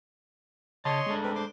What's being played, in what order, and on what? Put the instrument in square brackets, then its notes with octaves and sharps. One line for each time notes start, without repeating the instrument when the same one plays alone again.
[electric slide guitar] C#3 A5 [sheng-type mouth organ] C#5 D#5 C6
[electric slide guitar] G#3 A3 D4
[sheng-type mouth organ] C4 A#4 B4
C5 C6 D6